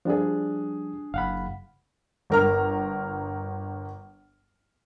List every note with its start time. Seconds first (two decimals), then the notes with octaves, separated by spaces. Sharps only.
0.05 F3 G3 D4 G#4
1.14 F#1 F5 F#5 B5
2.30 G1 A#4 F6